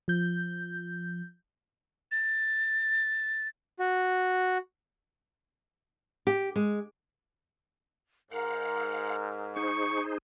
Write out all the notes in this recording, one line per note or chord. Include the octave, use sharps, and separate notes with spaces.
F3 G6
A6
F#4
G4
G#3
G#2 A#4 F5 F#5
D#4 G#4 C5 C#6